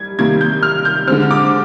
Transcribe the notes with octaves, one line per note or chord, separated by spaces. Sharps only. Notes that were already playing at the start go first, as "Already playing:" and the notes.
Already playing: G3 G#6
C3 D#3 G3 A#3 G#6
G6
F6
G6
D3 G#3 C4 F6
D6